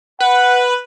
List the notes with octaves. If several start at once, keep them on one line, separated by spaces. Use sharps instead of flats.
B4 F#5